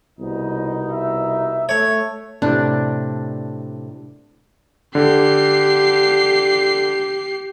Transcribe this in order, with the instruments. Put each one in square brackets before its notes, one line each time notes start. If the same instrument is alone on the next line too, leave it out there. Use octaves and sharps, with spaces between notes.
[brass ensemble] C2 B2 D#4
[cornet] E5
[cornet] A3 [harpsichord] C#5
[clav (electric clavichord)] A2 C3 [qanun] D4
[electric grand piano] D3 [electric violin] G4 C7